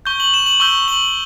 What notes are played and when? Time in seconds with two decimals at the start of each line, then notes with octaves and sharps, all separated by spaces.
0.06 C#6 G6 G7
0.20 F#7
0.34 E7
0.46 F#7
0.60 C#6 E6 G6 G7
0.88 F#7